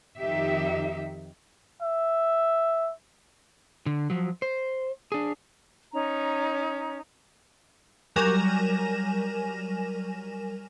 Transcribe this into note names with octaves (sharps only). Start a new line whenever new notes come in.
F2 D#3 D#4 G4 E5
E5
D3
F3 F#3
C5
D4 G#4
C#4 D#4 A#5
F#3 G3 A#4 G#5 A#6 E7